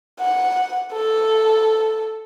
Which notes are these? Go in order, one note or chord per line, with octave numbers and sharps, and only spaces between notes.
F#5
A4